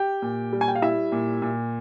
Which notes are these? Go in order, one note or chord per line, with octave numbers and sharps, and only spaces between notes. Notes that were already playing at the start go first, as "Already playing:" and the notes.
Already playing: G4 G5
A#2
G3
G#5
G5
F5
G3 E4 E5
A#2
A#2